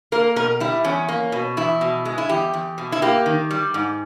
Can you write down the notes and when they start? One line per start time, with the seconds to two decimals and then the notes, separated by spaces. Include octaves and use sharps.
0.12 A#3 A#4
0.36 B2 A#4
0.60 G3 E4
0.84 E2 C#4
1.09 A#3
1.32 B2
1.57 E2 E4
1.81 B2
2.05 G#3
2.18 E4
2.29 E2 G4
2.54 E2
2.78 B2
2.92 E4
3.02 A#3 G4
3.26 D#3
3.51 G3
3.74 G#2